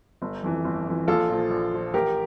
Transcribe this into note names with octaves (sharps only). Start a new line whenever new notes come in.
G1
F2 E3
G1
F2 E3
A#1 F4 A4
A#2 F3
A#1
A#2 F3
A1 G4 A#4